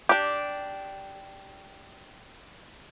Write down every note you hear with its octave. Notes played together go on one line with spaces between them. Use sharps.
D4 G4